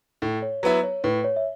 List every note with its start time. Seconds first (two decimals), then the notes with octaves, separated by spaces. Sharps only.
0.22 A2 A4
0.42 C#5
0.63 F#3 B3 E4 B4
0.83 C#5
1.04 A2 B4
1.24 C#5
1.36 E5